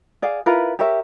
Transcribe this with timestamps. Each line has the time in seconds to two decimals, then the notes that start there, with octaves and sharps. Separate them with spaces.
0.22 G#4 D5 F5 F#5
0.46 E4 F4 A#4 B4
0.79 G4 A#4 C#5 E5